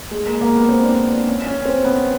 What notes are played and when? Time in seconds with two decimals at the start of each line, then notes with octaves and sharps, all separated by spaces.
0.11 G#3
0.26 A#3
0.41 A#3
0.55 B3
0.69 C4
0.84 D4
1.12 D4
1.27 C#4
1.46 C#4
1.65 C4
1.84 B3